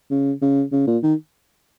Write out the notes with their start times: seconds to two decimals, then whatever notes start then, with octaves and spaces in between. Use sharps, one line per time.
0.11 C#3
0.42 C#3
0.72 C#3
0.87 A#2
1.03 D#3